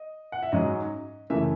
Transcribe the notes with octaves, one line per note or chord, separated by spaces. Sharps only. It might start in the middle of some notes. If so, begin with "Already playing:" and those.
Already playing: D#5
F#5
E5
G#2 F#3 C#4 D#5
F#2 C#3 E3 A3 E5